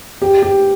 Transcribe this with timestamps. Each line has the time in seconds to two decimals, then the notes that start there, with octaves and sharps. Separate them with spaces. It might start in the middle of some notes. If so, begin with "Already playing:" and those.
0.22 G4
0.42 G4